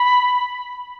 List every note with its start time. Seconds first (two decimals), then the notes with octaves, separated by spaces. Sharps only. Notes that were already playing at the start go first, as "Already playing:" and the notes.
Already playing: B5